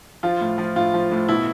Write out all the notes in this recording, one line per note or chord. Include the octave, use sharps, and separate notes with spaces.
F3 F4
A2
F3
A2 F4
F3
A2
B2 E4